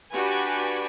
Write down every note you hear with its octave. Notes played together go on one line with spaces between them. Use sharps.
D4 F#4 G4 B4 G#5